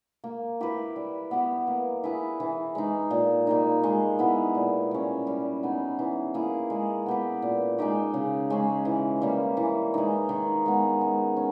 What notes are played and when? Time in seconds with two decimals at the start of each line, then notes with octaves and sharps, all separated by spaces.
0.24 A#3
0.60 E4 G4 B4
0.96 G3
1.31 B3 G4
1.67 A#3
2.04 E4 G#4 B4
2.40 E3
2.75 G#3 D#4
3.11 A#2
3.47 G3 A#3 D#4
3.84 G#3
4.19 B3 E4
4.55 A#2
4.91 G3 C#4
5.27 G3
5.63 B3 D#4 G#4
5.99 E3
6.34 A#3 E4 G#4
6.70 G#3
7.06 B3 G4 B4
7.42 A#2
7.78 G#3 D#4 G4
8.14 C#3
8.50 G#3 C#4
8.85 E3
9.21 G3 A#3
9.57 E3
9.94 G#3 D#4
10.29 D#3
10.66 G#3 B3
11.01 G#3
11.37 C#4